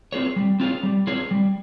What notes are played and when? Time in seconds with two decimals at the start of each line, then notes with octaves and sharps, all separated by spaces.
0.12 C4 F4 G#4 C#5
0.36 G3
0.60 C4 F4 G#4 C#5
0.83 G3
1.07 C4 F4 G#4 C#5
1.31 G3